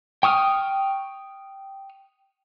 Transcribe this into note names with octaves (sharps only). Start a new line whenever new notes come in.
G5 C#6 D#6 F6